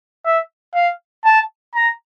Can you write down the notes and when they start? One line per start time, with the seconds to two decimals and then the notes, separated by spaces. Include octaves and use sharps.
0.25 E5
0.75 F5
1.25 A5
1.75 A#5